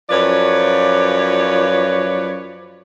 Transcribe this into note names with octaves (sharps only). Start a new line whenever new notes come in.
F#2 F3 B4 C#5 D5